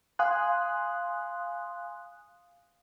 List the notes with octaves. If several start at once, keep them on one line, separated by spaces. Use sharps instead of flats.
F5 G#5 C6 D#6 F#6